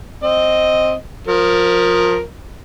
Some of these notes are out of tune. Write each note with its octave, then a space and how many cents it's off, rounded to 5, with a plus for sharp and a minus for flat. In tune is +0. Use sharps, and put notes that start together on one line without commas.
C4 +0 D#5 +0
F3 +25 A#4 +0